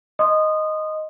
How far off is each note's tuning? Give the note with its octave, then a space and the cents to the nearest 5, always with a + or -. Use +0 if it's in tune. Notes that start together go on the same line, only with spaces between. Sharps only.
D#5 +0 C6 +0 D#6 -20